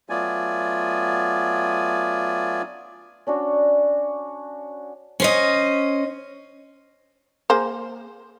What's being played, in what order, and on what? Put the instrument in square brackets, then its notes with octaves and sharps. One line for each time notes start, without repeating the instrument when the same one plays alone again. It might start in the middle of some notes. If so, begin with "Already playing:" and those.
[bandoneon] F#3 A3 B3 F4 D5 G#5
[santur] C#4 D4 F#4
[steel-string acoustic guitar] C#4 C5 D#5
[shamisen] A#3 G#4 C5